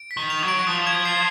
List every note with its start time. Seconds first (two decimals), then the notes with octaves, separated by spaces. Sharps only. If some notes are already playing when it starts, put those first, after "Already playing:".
Already playing: D7
0.11 B6
0.17 D#3
0.30 F7
0.42 F#3
0.48 D7
0.67 F3 D#6
0.87 G#6
1.05 C7